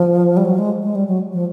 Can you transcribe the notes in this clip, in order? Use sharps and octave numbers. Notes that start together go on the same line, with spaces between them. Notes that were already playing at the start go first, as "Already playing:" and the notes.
Already playing: F3
G3
F#3
G#3
G#3
G3
F#3
F3